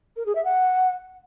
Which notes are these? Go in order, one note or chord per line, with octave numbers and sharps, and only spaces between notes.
A#4
G#4
E5
F#5